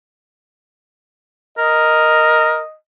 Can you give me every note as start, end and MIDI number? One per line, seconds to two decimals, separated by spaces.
1.58 2.60 70
1.58 2.76 75